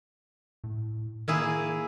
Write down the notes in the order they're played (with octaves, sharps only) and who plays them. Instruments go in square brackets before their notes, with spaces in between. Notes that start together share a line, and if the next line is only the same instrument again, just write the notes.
[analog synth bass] A2
[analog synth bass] D#3 [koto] A#3 E4 G#4